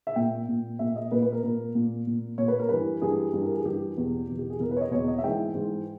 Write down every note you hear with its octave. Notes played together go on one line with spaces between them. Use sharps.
E5
A#2 G5
A#2
A#2 E5
D#5
A#2 B4
B4
A#4
A#2 A#4
A#2
A#2
A#2 C#5
B4
A#4
G2 E3 B4
G2 E3 G#4
G2 E3
A#4
G#4
G2 E3 G4
E2 B2
E2 B2
G4
G#4
E2 B2 A#4
B4
C#5
D#5
E2 B2 C#5
D#5
E5
G#2 E3 G5
G#2 E3